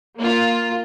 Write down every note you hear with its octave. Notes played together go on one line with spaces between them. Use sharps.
A#3 F4